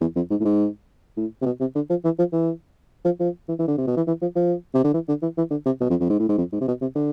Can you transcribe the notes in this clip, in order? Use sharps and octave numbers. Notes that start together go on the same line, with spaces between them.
E2
F2
G#2
A2
G#2
A2
C3
B2
C3
D3
F3
E3
F3
E3
F3
F3
E3
E3
D3
C3
B2
E3
E3
F3
F3
C3
D3
E3
D3
E3
E3
D3
C3
B2
F2
F2
G#2
A2
G#2
F2
G#2
C3
B2
C3
D3